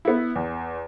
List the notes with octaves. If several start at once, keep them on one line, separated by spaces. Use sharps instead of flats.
B3 E4
E2